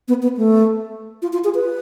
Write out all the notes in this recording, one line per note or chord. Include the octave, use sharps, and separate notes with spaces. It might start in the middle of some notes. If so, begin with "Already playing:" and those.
B3
B3
A3
F4
F4
G#4
B4